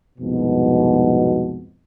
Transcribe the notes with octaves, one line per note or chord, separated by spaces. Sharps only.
C2 F2 G#2 B2